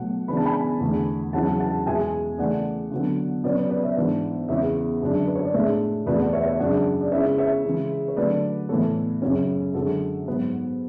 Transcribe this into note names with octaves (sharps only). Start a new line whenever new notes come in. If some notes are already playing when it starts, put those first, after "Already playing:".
Already playing: B2 F#3 A3 F#5
C#3 E3 G#3 B3 D4 B5
A5
G#5 B5
E2 D3 A3
E2 C#3 F#3 C#4 E4 F#5 A5
F#5 A5
E2 B2 G#3 E5 G#5
C#3 E3 A3 D5 F#5
D3 F#3 B3
B2 F#3 C#4 B4 D5
B4 D5
B4 D5
C#5 E5
G#2 E3 B3 D4
E2 C#3 E3 G#3 B3 C#5 E5
F#2 D3 G#3 D4
B4
C#5
D5
A2 G#3 D4 C#5 E5
E2 B2 A3 B4 D5
D5 F#5
C#5 E5
C#5 E5
F#2 C#3 G#3 D4 D5 F#5
D5
C#3 G#3 C#4 E4 C#5 E5
C#5 E5
C#3 E3 G#3
C#5
D3 F#3 A3 B4 D5
A2 E3 B3 A4 C#5
F#2 C#3 F#3 C#4
F#2 D3 G#3 F#4 A4
G#2 F#3 B3